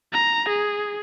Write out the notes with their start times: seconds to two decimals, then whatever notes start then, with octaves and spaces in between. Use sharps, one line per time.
0.13 A#5
0.49 G#4